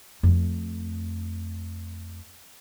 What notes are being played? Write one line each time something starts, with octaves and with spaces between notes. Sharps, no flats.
F2 A3